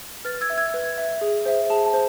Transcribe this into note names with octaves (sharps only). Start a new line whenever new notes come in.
B4 F6 A6
E6 G#6
E5
E6 G#6
B4
E5
G#4
C5 E5
G#4 A5
A5
C5